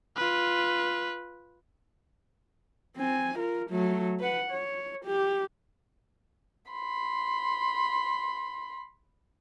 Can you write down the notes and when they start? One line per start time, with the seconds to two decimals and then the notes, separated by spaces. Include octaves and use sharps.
0.16 F4 B4
2.97 C4 G#5
3.37 F4 A#4
3.70 F#3 A3
4.20 B4 F#5
4.51 C#5
5.05 G4
6.71 B5 C6